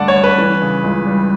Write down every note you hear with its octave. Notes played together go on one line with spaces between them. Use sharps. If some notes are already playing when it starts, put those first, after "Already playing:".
Already playing: G2 D3 A3 D5 F#5 A5
C#5
G2
B4
E3
C#3
C#2
G3